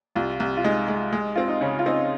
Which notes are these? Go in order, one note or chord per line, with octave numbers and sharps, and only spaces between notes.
C2 F4
C2
F4
G#3 D#4
G#3
G#3
C4 F4
D#4
C#3 C#4
F4
C4 D#4